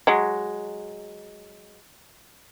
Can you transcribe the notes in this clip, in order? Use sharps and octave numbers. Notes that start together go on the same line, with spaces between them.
F#3 G#3